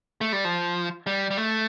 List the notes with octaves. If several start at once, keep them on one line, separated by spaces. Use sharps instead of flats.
A3
G3
F3
G3
G3
A3